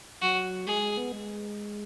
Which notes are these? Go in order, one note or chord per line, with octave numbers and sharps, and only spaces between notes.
F#3 F#4
G#3 G#4
G#3
B3
G#3